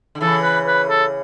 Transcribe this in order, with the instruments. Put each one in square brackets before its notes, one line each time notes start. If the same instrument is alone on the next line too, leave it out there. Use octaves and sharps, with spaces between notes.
[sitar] D3
[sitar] C#3 E3 [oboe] A4
[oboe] B4
B4
A4